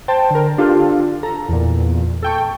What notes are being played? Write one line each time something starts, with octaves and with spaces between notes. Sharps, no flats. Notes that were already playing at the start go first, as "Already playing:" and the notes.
C5 G5 A5
D3 A#4
D4 F4 G4 A4
A4 A#5
E2 A#2
A4 G5 C#6